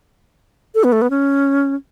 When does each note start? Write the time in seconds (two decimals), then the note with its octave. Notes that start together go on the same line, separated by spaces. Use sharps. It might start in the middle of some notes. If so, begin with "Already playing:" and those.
0.75 A4
0.84 B3
0.92 A3
1.02 B3
1.10 C#4